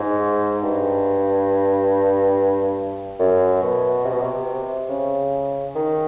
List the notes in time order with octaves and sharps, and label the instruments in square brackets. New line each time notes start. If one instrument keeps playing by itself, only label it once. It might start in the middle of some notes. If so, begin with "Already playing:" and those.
Already playing: [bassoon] G#2
G2
F#2
B2
C3
B2
C3
C#3
D#3